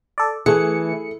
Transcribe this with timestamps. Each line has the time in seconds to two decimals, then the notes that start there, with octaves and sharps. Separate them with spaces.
0.18 A4 D5
0.46 E3 A3 G#4 C#7